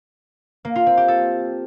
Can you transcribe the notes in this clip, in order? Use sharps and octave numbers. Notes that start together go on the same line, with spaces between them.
A#3
F4
C4
G4
A4